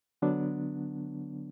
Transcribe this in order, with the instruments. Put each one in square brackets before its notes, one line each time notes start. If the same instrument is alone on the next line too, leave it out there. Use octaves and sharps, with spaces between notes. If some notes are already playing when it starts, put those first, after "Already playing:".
[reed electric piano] D3 F#3 B3 D4